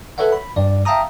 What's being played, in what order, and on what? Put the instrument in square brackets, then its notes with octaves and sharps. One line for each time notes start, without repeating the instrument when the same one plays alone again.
[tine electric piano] A4 B4 C#5 E5 F#5
B5
G2 D5
E5 F5 G5 A5 A#5 D#6